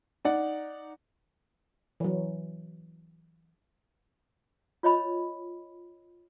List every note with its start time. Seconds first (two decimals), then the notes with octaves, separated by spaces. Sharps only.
0.25 D#4 D5 F#5
2.00 E3 F#3
4.83 F4 C#5 D#5 B5